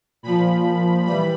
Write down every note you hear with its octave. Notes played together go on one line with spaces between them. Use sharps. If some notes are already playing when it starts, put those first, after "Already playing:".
A#2 F3 B5
E3 G3 B5